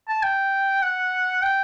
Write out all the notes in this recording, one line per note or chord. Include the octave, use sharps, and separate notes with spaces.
A5
G5
F#5
G5